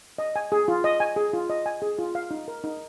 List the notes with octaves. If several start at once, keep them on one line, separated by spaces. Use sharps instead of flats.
D#5
G#5
G#4
F4
D#5
G#5
G#4
F4
D#5
G#5
G#4
F4
F5
D#4
A#4
D#4